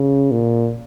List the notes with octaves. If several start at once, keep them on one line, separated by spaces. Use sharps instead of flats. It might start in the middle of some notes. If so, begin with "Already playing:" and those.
Already playing: C#3
A#2